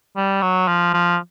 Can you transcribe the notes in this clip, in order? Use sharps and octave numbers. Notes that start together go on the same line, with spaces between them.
G3
F#3
F3
F3